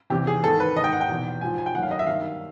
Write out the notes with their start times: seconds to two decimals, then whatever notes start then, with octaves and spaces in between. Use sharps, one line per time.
0.10 E2 C3 E3 G4
0.27 G#4
0.43 G#2 D#3 A4
0.60 B4
0.76 D#3 D#5
0.80 G#2 G5
0.93 F#5
1.01 G5
1.09 E2 B2
1.41 G#2 F3 G#5
1.58 G#5
1.66 G5
1.74 D#3 F#5
1.78 F#2 F5
1.91 D#5
1.99 E5
2.07 G2 D#3 F5